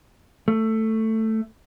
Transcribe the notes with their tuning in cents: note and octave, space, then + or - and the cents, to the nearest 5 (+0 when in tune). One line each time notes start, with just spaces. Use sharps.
A3 +10